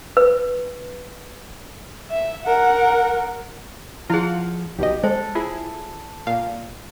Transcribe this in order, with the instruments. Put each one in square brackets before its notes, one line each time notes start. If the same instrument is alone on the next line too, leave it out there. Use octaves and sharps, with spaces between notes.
[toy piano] B4
[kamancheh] E5
A#4 F#5
[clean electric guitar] F3 [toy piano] E4 G#4 [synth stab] F4 F5 F#5
[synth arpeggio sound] B1 B2 D#5 [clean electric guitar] G4
[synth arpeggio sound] G#3 [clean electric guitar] A4 [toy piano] C5
[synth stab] E4 G#4 [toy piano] F4
[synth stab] A#2 [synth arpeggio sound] F5